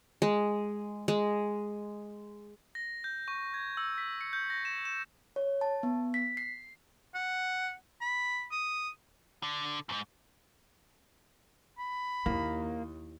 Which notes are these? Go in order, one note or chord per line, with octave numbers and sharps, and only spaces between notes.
G#3
G#3
A#6
G6
C#6
G#6
E6
B6
C#7
G6
A#6
E7
E7
C#5
A5
B3
B6
C7
F#5
B5
D#6
D3
E2 G#2
B5
D#2 A#3 E4